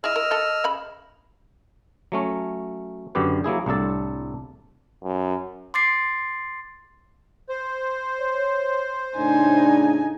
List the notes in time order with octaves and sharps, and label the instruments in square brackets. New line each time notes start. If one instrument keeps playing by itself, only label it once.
[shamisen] E4 G#4 [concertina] D#5 E6 F6
[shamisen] A#4
A4 G5
C#3 G#5 B5
[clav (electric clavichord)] F#3 A3 C#4
F#2 D3 G4 B4
F#3 A#3 E4 G#4
C2 A2 D4 A4 A5
[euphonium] F#2
[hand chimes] C6 D6 A6 C7
[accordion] C5
[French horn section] C#5
[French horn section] A2 C#3 D4 [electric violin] D#4 G#5